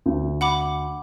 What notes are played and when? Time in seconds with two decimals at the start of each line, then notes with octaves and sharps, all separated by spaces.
0.06 D2
0.41 F#5 B5 D6